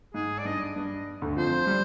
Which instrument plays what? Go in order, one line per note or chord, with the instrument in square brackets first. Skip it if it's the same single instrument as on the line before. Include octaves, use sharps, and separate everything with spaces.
[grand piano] G#2 [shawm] G#4
[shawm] D5
[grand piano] G2 [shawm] D#5
[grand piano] G2
D2 D3
[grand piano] F2 F3 [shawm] C5
[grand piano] G3